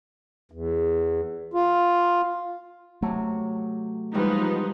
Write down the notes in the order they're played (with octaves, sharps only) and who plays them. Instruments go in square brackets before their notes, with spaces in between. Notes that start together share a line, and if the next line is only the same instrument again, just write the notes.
[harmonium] E2
F4
[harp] C3 F#3 [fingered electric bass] A3
[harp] E3 G3 G#3 [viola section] F3 B3 D#4